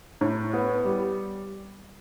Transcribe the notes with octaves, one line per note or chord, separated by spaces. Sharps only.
A2
B3
G3